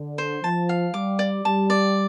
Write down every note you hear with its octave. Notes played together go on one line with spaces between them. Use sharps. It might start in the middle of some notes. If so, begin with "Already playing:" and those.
Already playing: D3
C5
F3 A5
F5
G3 D6
D5
G3 A5
D5